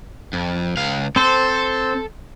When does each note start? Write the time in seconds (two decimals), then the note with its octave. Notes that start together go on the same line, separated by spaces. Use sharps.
0.33 F2
0.77 C#2 F5
1.16 C4 A4 C5